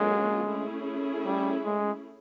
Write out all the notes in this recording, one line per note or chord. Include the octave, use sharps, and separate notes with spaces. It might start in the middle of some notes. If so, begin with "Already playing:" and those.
Already playing: D3 F#3 G#3 A#3 C#4 F4
A3 C#4 E4 G#4
G3
G#3